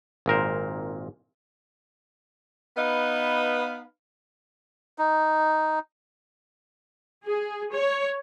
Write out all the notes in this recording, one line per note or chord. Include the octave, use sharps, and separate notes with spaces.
G#1 A#2 A#4 C5
B3 D#4 B4 F5
D#4
G#4
C#5